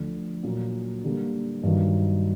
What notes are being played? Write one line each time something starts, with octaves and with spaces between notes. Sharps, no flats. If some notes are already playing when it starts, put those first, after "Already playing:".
Already playing: D2 D3 F3
A#2 F#3 A#3
D3 G3 A#3
G2 D#3 F#3